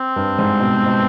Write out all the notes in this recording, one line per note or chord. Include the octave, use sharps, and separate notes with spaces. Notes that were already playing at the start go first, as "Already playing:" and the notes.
Already playing: C4
G2
G#2
B2
B2